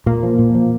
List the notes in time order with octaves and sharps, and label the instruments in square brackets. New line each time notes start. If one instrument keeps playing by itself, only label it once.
[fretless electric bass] A#2 [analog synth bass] A#3
[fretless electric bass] F3
A#2
F3